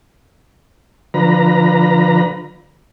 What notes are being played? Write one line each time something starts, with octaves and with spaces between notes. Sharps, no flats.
D3 F3 B4 A#5